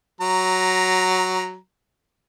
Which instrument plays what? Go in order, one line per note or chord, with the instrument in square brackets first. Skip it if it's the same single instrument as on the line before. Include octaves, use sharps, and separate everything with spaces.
[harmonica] F#3 A#5